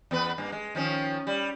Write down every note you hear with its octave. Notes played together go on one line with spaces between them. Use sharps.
E2 B3 B4
G2 A#3
G#3
D#3 F3 C#4
G3